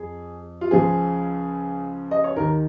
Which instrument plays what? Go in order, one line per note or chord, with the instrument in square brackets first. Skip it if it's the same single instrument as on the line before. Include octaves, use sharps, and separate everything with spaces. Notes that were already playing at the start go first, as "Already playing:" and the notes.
Already playing: [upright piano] F2 G#4
F4
C#2 C#3 F3 G#4
D#5
C#5
D#2 D#3 A#4